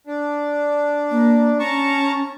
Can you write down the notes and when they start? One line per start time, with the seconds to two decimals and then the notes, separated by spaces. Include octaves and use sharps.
0.07 D4
1.10 A#3
1.60 C#4 A5 A#5 C#6